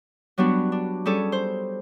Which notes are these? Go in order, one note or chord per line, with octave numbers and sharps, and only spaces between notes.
F#3 G3 B3 D4 F#4
D4
G3 C#4 G#4 A4
C5